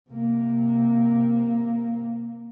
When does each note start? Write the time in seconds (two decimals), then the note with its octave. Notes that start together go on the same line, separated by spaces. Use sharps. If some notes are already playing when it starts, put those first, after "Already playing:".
0.10 C3 A#3